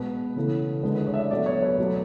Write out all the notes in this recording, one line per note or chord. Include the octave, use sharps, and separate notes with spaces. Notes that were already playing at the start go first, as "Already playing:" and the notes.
Already playing: B2 G#3 B4
C#3 E3 A3
D3 G#3 B4
B4
C#5
E5
D5
B2 F#3 A3 D5
C#5
B4
B2 F#3 A3